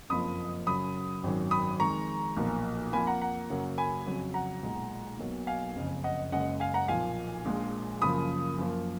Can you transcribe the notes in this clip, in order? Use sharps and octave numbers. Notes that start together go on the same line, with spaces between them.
F#1 F2 F3 A#3 B5 D#6
F#2 C#3 F#3 B5 D#6
G#1 F#2 D#3 F#3
B5 D#6
F2 D#3 G#3 A#5 C#6
B1 A#2 F3 A#3
F2 F3 A#3 G#5 B5
F#5 A#5
F#5 A#5
F#2 C#3 F#3 A#3
G#5 B5
F2 C#3 F#3
F#5 A#5
B1 A#2 G#3
B1 B2 F#3 A#3
F5 G#5
F#1 F2 C#3
D#5 F#5
F#1 F#2 C#3 G#3 D#5 F#5
F5 G#5
F#5 A#5
B1 A#2 F3 A#3 F5 G#5
A#1 A#2 F3 G#3
F#2 C#3 F3 A#3 B5 D#6
F#2 F3 A#3